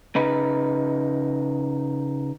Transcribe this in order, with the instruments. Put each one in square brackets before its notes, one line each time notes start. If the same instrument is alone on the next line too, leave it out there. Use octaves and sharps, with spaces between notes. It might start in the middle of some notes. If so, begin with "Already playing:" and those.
[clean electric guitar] C#3 D#4 B4